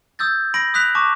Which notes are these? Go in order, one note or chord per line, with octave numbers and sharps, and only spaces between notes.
D#6 E6 G6 A6
B5 A#6 D7 F#7
D#6 F#6 B6 F7
A5 C#6 D6